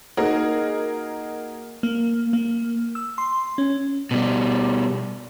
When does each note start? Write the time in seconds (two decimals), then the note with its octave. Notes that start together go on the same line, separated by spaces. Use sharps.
0.17 A#3 D#4 F#4 G#4 A#4 D#5
1.83 A#3
2.33 A#3
2.95 E6
3.18 C6
3.58 C#4
4.11 B2 G3